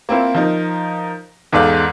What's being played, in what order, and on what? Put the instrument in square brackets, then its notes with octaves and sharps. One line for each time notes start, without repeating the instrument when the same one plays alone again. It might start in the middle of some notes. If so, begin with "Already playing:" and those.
[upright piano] A#3 C4 E4 F4
F3 D#4 A#4
E2 G#2 A4 D5 F5